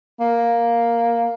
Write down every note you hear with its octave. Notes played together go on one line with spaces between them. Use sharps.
A#3